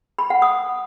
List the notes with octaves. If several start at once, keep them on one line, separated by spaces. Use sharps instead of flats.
B5
F#5
D#6